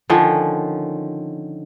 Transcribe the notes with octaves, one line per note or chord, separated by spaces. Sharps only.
D3 D#3 F3 C#4